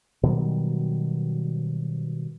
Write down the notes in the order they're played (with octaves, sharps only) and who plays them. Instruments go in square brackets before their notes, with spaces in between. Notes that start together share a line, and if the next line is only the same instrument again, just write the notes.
[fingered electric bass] B2 D#3 F#3 G3